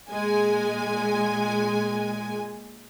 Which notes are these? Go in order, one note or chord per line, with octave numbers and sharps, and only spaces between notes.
A#2 G#3 G#5